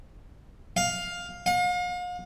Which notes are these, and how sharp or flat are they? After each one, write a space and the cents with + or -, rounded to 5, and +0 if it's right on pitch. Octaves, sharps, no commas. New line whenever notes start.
F5 +10
F5 +40